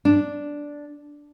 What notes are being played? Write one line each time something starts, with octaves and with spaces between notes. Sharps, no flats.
D4